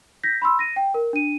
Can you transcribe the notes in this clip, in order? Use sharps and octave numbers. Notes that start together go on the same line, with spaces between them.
G6 A#6 B6
B5 C6 E6
A#6 D#7
G5
A#4
D4 D#7